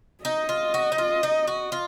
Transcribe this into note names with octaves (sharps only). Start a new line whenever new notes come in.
D#4 D#5
F4
F#4
D#4
F4
D#4
F#4
F4